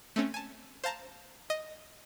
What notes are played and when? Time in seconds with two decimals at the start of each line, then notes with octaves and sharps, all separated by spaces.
0.16 A3 C4 C#4
0.34 G#5 A5
0.84 C5 F5 A5 A#5
1.50 D#5